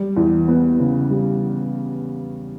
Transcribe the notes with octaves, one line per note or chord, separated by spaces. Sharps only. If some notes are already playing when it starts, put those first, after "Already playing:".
Already playing: G3
E2
B3
C#3
G3